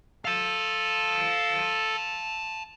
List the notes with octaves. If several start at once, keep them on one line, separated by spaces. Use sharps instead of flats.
A4 F5 A5